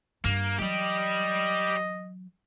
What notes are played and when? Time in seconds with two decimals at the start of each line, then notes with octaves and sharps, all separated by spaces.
0.24 G2 A#3
0.59 E3 F#3 G4 D5 D#5